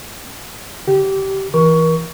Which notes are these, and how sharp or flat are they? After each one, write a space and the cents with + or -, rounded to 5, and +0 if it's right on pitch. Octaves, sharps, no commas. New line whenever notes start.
D3 -10 G4 -20
E3 -5 A#4 +35 C#6 +15